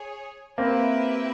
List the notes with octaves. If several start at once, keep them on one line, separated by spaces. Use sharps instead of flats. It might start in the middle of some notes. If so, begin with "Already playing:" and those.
Already playing: G#4 C#5
A#3 C4 E4 G4 B4 E5